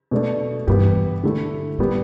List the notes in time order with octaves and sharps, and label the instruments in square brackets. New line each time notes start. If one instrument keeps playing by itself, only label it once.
[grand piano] B2 A3 D4
[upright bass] G2 [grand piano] E3 B3 E4 G4
[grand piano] D3 A3 E4
[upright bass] A2 [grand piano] G3 B3 G4